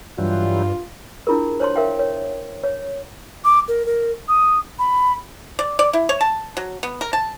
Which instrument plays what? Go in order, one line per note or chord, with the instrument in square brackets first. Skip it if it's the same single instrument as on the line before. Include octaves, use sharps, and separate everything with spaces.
[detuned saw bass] G2 [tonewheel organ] E3 F#3 G3 [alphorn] F4
[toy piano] D4 E4 F4 G#4 A#4
C5 C#5 A5 C6
A#4 E5 F5 G5
C#5
C#5
[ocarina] D6
A#4
A#4
D#6
B5
[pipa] D5
D5
E4
C#5
A5
F#3
B3
A#4
A5